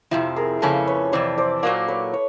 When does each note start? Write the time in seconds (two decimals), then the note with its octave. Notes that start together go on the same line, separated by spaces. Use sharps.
0.11 F2 C3 F3 E4
0.36 G#4 A#4
0.62 F2 C#3 F3 A#3 C#4 A4 B4
0.87 B4 C#5
1.12 F2 C3 E3 C5 D5
1.38 C5 D5
1.63 A#2 F#3 A#3 C5 D5
1.88 B4 C#5
2.14 C#5